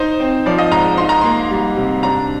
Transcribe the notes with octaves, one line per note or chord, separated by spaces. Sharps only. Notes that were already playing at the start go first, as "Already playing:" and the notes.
Already playing: D#4 C5
C4
F3 D5
D#5
G#2 A#5
D#4 C6
A#5
A#3 C6
G3
C3
D4 A#5